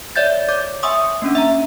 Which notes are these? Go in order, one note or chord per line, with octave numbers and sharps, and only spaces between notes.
C#5 D5 E5 G6 A6
C#5 D6 G6
E5 G#5 C6 C#6 D#6 E6
A#3 C#4 D4
E5 A#5